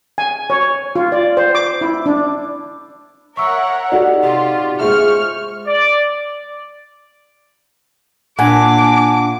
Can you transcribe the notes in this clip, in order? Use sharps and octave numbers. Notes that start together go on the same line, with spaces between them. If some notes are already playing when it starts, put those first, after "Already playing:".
G#5
C#5
F4
D5
C5
D6
E4
D4
A#4 C#5 E5 F#5 C#6 E6
D#4 F#4 G4 A4 D5 F#5
C3 F4 G4
G#3 F4 G#4 C5 E5 C#6 F6
D5
A#2 D4 F#5 G#5 D6